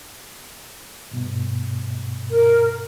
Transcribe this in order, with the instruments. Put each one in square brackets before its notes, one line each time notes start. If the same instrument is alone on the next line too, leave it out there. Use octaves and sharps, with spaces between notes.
[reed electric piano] G2 B2
[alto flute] A#4